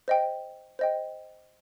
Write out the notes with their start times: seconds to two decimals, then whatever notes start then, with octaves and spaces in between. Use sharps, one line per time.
0.08 C5 D#5 G5
0.79 C5 D#5 G5